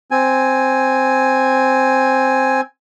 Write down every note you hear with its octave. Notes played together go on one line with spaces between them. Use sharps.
C4 G#5